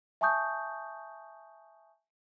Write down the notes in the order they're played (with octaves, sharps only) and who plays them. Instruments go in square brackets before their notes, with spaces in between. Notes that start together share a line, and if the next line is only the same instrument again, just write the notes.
[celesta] E5 G#5 A5 C#6 D#6 G6